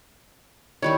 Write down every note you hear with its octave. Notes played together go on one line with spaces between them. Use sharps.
D#3 G3 E4 C#5